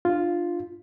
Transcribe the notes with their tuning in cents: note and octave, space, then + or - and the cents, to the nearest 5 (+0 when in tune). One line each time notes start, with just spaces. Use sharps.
D4 +35 F4 +0